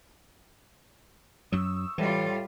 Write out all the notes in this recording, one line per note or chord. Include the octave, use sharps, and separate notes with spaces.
F#2 F#3 C#6 D#6 E6
A2 E3 G3 F4